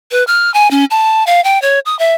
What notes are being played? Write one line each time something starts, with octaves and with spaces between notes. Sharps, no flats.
B4
F6
G#5
C#4
A5
F5
G5
C#5
D#6
E5